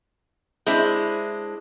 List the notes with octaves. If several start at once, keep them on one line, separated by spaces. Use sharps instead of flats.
G#3 C4 D4 E4